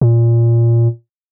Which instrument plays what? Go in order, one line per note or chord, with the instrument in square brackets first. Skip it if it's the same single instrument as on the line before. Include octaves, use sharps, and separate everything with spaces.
[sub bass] A#2